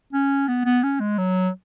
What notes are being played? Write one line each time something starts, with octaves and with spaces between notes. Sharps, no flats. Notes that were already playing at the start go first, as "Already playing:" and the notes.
C#4
B3
B3
C#4
G#3
F#3